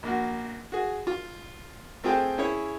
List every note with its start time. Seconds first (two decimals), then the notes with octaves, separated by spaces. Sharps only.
0.03 A#1 A#3 F#4
0.72 F#4 G#4
1.07 F4
2.04 A3 C4 F4 G#4 G5 A5
2.38 C#4 E4 G#4 C#5